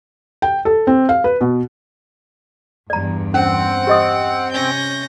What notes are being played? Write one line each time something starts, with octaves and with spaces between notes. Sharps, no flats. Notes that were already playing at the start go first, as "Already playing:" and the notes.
G5
A4
C4
F5
B4
B2
E2 G2 D5 A#5
C4 C#4 F#5
G4 D#5 D#6
C3 C#4 G6 A#6